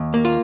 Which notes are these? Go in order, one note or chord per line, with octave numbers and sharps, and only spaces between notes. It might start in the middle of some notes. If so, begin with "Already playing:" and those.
Already playing: D#2
A#3
F4